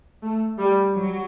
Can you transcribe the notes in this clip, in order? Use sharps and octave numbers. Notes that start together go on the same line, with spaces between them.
A3
G3
F#3